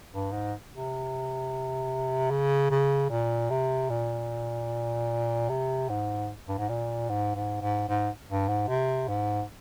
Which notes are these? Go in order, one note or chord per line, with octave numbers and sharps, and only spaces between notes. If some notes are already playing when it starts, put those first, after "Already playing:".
G2
G#2
C3
C#3
C#3
A#2
C3
A#2
C3
G#2
G2
G#2
A#2
G#2
G#2
G#2
G#2
G2
G#2
C3
G#2